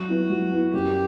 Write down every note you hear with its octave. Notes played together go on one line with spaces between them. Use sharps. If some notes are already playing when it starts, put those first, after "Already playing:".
Already playing: F#3 F#4
B3 E4
F#3
B3 E4
F#2 G4